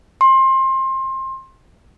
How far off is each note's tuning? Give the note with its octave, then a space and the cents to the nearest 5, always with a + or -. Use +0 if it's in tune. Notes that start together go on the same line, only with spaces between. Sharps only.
C6 +25